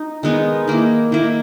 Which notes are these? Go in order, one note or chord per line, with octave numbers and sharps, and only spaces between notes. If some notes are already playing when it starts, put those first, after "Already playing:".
Already playing: D#4
D#3 G#3 B3 D#4
D#3 A#3 E4
D#3 A#3 E4